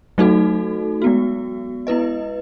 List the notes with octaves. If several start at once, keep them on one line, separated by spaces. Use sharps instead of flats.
F#3 A3 D#4 F#4 A4
G#3 B3 F#4
B3 E4 B4 D#5